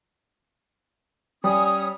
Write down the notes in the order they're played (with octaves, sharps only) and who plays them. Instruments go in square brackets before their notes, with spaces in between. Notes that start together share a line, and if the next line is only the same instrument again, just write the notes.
[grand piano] G3 [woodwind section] C#4 D#6